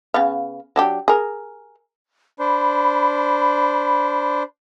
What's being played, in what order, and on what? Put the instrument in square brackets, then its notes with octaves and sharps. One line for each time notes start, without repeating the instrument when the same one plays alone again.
[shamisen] C#3 B3 F5
F#3 D4 G4
G#4 A#4
[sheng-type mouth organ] D4 C5 [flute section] B5